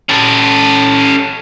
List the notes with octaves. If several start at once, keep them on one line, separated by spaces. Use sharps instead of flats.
C#4 A4